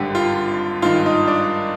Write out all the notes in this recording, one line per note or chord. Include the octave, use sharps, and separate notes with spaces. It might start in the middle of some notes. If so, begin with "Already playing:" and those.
Already playing: G#1 G2 D3 G4
F4
G#1 G2 D#3 F4
D#4
D4